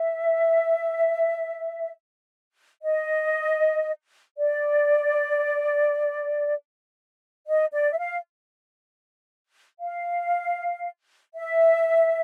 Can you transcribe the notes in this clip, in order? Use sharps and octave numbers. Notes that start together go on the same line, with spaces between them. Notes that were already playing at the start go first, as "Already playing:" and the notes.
Already playing: E5
D#5
D5
D#5
D5
E5
F5
F5
E5